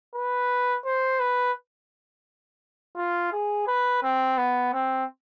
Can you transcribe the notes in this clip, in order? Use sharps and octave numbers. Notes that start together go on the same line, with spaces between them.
B4
C5
B4
F4
G#4
B4
C4
B3
C4